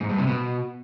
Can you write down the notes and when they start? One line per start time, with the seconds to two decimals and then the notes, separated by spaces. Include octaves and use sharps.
0.01 G#2
0.10 G2
0.18 C3
0.27 B2